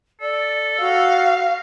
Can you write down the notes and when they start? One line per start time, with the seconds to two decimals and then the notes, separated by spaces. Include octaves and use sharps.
0.22 A4 D5
0.80 F#4 F5